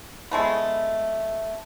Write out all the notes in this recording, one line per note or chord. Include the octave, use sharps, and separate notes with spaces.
G#3 A3 B3